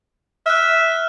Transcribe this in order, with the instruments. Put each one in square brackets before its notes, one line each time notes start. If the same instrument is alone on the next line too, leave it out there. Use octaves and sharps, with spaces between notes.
[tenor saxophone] E5 [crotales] F6 F#6